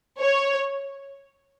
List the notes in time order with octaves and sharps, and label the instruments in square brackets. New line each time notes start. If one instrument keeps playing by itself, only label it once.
[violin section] C#5